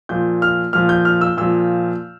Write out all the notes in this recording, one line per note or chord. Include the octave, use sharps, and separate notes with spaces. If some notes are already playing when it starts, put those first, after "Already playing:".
A#2 F3 G6
F6
A#2 F3 F6
G6
F6
E6
A#2 F3 E6